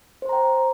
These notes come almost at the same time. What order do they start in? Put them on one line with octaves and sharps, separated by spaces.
C5 C6 A#5 G5